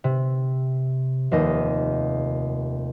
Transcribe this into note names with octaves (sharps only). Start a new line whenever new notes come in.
C3
F1 D#2 D#5 D#6